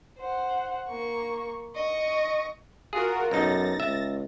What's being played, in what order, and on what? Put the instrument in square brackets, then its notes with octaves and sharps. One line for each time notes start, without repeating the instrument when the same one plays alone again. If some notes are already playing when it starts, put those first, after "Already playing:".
[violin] C5 F#5
A#3 C#6
D#5 C#6
[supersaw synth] F4 F#4 A#4 [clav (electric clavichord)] G#4
[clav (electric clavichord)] B1 D#4 [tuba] F#2 [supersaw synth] A6 A#6
[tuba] C#2 [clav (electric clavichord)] E5